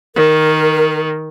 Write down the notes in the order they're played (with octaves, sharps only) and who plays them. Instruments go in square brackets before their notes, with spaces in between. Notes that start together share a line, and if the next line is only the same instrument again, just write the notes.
[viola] D#3 [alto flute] A#4